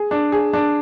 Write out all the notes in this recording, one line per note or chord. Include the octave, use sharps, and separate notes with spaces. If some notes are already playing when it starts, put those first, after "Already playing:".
Already playing: G#4
D4
G#4
D4